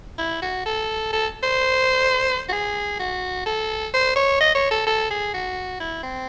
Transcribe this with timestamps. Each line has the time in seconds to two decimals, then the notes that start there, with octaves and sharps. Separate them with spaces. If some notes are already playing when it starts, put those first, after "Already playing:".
0.18 E4
0.42 F#4
0.66 A4
1.13 A4
1.43 C5
2.49 F#4
2.52 G#4
2.99 F#4
3.45 A4
3.93 C5
4.16 C#5
4.40 D#5
4.55 C#5
4.71 A4
4.87 A4
5.10 G#4
5.34 F#4
5.80 E4
6.03 C4